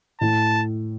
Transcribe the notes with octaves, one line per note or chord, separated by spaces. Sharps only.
A2 A5